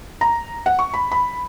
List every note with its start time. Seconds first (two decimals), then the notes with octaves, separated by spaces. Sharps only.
0.21 A#5
0.66 F#5
0.79 C#6
0.94 B5
1.12 B5